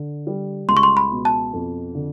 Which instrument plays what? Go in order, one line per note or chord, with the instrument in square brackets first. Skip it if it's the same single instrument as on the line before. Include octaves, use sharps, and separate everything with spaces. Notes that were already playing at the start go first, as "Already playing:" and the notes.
Already playing: [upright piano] D3
G3
[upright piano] C#2 [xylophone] C6
[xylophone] C#6
C6
B5
[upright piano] B2
[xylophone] A5
[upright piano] F2
D3